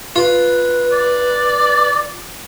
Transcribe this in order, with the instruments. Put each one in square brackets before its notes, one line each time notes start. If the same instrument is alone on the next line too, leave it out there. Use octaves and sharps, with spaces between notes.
[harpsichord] F4 [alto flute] B4
[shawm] D5